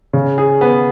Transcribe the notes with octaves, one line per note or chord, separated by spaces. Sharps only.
C#3
G#4
B3